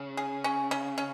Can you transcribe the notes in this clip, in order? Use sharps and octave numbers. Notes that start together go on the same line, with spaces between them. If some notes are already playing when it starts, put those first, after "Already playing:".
Already playing: C#3
G#4
C#4
C#4
C#4